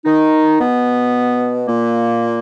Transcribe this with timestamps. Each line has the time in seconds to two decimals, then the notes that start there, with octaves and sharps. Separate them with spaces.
0.05 D#3 D#4
0.59 B2 B3
1.67 A#2 A#3